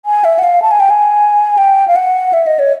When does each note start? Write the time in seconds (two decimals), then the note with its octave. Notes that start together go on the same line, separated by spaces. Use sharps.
0.06 G#5
0.24 E5
0.39 F#5
0.43 F5
0.62 A5
0.71 G#5
0.80 G5
0.90 G#5
1.58 G5
1.88 F5
1.96 F#5
2.33 E5
2.47 D#5
2.59 C#5